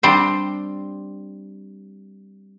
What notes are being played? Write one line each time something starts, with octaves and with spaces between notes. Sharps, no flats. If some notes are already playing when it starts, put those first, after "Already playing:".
G3 C4 D4 C5